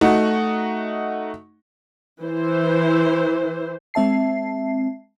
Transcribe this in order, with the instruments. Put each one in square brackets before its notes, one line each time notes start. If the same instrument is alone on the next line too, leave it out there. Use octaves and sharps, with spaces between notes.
[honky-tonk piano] A3 D#4 F#4
[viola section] E3 C5
[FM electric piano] G#3 C4 E5 A5 C7